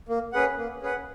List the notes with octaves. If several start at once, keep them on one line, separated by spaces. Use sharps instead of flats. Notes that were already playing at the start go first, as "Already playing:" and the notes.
A#3
C#4 G#4 B4 F#5
A#3
C#4 G#4 B4 F#5